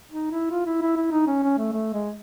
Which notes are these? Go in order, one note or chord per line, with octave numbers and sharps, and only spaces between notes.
D#4
E4
F4
E4
E4
E4
D#4
C#4
C#4
A3
A3
G#3